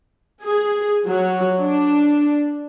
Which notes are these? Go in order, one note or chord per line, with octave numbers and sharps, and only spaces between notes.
G#4
F#3
D4